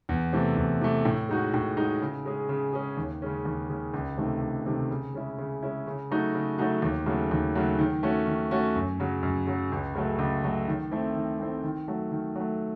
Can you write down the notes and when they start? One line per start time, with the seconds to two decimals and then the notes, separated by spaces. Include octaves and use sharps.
0.09 E2
0.33 C3 E3 A3
0.57 E2
0.81 C3 E3 A3
1.05 A2
1.29 G#3 D#4 F#4
1.54 A2
1.77 G#3 D#4 F#4
2.02 C#3
2.25 G#3 C#4 G#4
2.49 C#3
2.73 G#3 C#4 G#4
2.97 D#2
3.22 C#3 G#3 C#4
3.45 D#2
3.69 C#3 G#3 C#4
3.94 C#2
4.17 C3 D#3 A3
4.42 C#2
4.66 C3 D#3 A3
4.91 C#3
5.14 G#3 C#4 E4
5.38 C#3
5.63 G#3 C#4 E4
5.87 C#3
6.11 F#3 A3 D#4 F#4
6.35 C#3
6.58 F#3 A3 D#4 F#4
6.82 D#2
7.06 C#3 F#3 A3
7.31 D#2
7.55 C#3 F#3 A3
7.79 D#3
8.03 A3 C#4 F#4
8.27 D#3
8.51 A3 C#4 F#4
8.76 F#2
9.00 C#3 F#3
9.23 F#2
9.47 C#3 F#3
9.72 C#2
9.95 C#3 F#3 A3
10.19 C#2
10.43 C#3 F#3 A3
10.68 D#3
10.91 A3 C4 E4
11.15 D#3
11.40 A3 C4 E4
11.64 D#3
11.88 F#3 A3
12.12 D#3
12.36 F#3 A3